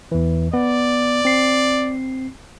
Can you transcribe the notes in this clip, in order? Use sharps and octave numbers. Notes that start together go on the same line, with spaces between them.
E2 E3
B3 D5
C4 C7